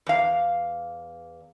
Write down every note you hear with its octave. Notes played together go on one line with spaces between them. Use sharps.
E2 F5